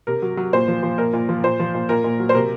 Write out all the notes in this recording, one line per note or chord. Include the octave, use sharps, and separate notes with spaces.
C3 A#4
F#3
F#3
A#2 C5
F3
F3
A#2 A#4
A#2
F3
A#2 C5
F3
A#2
A#2 A#4
A#2
F#3
C5
C3 A#4